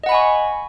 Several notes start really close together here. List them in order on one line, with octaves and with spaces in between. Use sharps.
D#5 F#5 B5 G#5 C#6